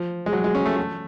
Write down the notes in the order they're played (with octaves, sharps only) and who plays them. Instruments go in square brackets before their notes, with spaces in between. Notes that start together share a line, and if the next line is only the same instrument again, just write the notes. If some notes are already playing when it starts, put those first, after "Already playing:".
Already playing: [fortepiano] F3
G#3
F#3
G#3
C#4
A3
A3